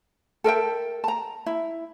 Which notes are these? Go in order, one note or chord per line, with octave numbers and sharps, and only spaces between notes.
A4 A#4 E5 G5
A5 A#5
E4